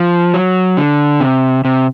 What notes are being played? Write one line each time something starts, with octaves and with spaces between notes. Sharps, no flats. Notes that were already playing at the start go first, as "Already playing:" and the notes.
Already playing: F3
F#3
D3
C3
C3